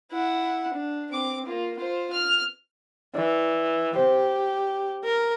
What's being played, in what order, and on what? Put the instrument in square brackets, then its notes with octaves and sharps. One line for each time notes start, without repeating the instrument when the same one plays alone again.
[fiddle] E4 F#5
D4
C4 D6
A#3 F4
F4 C5
F6
[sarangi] E3 [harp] D5
[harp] C4 C5 [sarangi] G4
[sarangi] A#4